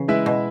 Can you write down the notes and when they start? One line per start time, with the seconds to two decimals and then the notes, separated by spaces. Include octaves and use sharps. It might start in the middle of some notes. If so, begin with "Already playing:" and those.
Already playing: C#3 E3
0.08 G#3 E4 B4 E5
0.26 B2